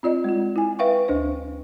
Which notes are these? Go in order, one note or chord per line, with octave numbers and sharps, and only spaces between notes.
C4 F4 D5 D#5
G#3 F4
E4 G#5
B4 E5 F5 G5 C#6
D2 D4 C5